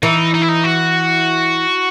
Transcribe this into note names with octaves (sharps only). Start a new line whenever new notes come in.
E3 D#4
D#4
E4
D#4
F#4